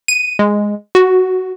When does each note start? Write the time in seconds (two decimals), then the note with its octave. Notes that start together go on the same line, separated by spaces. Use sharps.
0.08 D#7
0.39 G#3
0.95 F#4